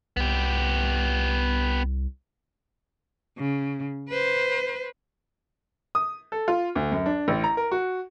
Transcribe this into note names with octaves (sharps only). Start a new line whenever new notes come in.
C2 B3 G4
C#3
B4 C5
D#6
A4
F4
D2
F#2
D4
A1
A#5
A#4
F#4